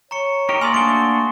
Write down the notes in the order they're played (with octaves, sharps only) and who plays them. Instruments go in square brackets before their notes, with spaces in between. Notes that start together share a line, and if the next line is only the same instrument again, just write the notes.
[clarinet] C#5 [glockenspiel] A#5 C#6 C#7
[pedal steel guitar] D#4 G4 A#4 [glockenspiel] C#6
[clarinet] A#3 [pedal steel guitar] A#4 D5 [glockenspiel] G#5 C6 D#6
[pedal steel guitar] A3 D4 F#4 [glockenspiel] D7 G7